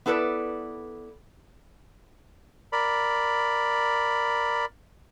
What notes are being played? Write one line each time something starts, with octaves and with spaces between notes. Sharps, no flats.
B3 E4 A4 B4 D5
A#4 D5 B5